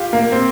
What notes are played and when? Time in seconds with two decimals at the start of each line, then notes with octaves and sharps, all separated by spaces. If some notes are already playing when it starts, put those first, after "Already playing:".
Already playing: F4 G4
0.13 A#3
0.32 C4